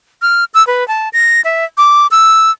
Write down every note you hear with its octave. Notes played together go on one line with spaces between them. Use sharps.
F6
E6
B4
A5
A#6
E5
D6
E6